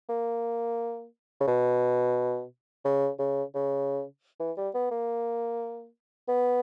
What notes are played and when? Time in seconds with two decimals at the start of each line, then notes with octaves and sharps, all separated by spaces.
0.09 A#3
1.40 C#3
1.47 B2
2.85 C#3
3.19 C#3
3.54 C#3
4.40 E3
4.57 G3
4.74 B3
4.91 A#3
6.29 B3